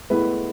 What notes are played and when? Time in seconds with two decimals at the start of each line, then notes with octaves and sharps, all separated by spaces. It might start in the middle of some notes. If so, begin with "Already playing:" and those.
0.10 A2 G#3 B3 E4 B4